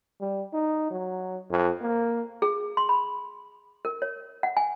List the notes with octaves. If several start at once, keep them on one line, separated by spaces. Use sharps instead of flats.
G3
D#4
F#3
F2
A#3
G#4
C6
B5
A#4
C#5
F#5
G#5